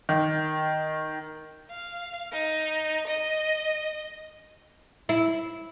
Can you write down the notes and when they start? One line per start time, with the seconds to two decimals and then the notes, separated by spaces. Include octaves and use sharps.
0.09 D#3
1.71 F5
2.33 D#4
3.08 D#5
5.09 E4